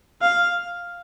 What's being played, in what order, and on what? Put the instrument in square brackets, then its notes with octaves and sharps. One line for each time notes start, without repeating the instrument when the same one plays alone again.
[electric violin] F5